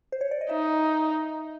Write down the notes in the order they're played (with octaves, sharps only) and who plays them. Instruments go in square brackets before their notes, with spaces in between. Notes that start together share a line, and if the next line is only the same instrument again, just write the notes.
[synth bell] C5
C#5
D5
D#5
[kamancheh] D#4 [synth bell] E5